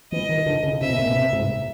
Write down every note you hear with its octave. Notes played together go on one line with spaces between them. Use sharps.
E3 D#5
D#3
D3
C#3
C3 E5
B2
A#2
B2
C3
G#2